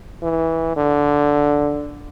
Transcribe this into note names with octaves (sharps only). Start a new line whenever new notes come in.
E3
D3